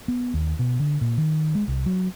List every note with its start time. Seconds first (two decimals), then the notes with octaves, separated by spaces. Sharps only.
0.08 B3
0.34 D#2
0.59 B2
0.79 D3
1.01 A#2
1.18 D#3
1.55 G#3
1.68 C2
1.86 F#3